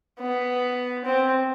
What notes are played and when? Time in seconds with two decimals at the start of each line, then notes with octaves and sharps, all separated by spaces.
0.20 B3
1.05 C4